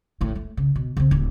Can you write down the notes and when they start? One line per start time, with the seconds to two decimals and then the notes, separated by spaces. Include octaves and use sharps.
0.21 A1 A2
0.35 A3
0.57 C#3
0.76 B2
0.97 C#3 C4
1.11 D1